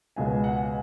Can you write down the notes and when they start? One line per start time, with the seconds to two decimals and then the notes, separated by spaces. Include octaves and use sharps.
0.16 C#2 B2 G#3 B3 G#5
0.44 F#5
0.58 G#5